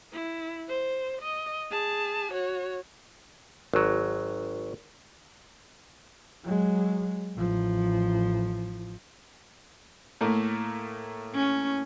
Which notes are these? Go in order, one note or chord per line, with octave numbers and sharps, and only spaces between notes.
E4
C5
D#5
G#4 A5
F#4 C#5
G#1 F#3
F#3 G#3
A1 F3
A2 A3 A#3
C#4